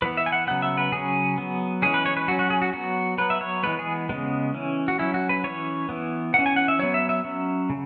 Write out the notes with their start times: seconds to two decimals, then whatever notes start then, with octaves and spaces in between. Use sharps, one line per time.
0.02 E3 B3 B4
0.17 E5
0.26 G#5
0.32 F#5
0.47 C#3 F#3 B3 F#5
0.62 E5
0.77 B4
0.92 C#3 F#3 C#4 G#4
1.38 F#3 B3
1.82 E3 G#3 C#4 G#4
1.94 B4
2.06 C#5
2.17 B4
2.28 F#3 F#4
2.31 C#4
2.39 F#4
2.50 G#4
2.62 F#4
2.73 F#3 B3 F#4
3.18 F#3 B3 B4
3.30 E5
3.41 C#5
3.63 E3 G#3 B3 B4
3.79 G#4
4.09 C#3 G#3 B3
4.54 E3 C#4
4.88 F#4
4.99 F#3 C#4 E4
5.14 F#4
5.29 B4
5.44 E3 C#4 C#5
5.89 E3 B3
6.34 E3 C#4 F#5
6.46 G#5
6.56 F#5
6.68 E5
6.79 F#3 B3 C#5
6.94 E5
7.09 E5
7.24 F#3 C#4
7.70 C#3